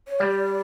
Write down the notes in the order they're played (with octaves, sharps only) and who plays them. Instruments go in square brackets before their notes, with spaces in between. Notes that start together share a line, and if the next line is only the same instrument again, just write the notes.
[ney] C#5
[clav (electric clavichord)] G3 [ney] D5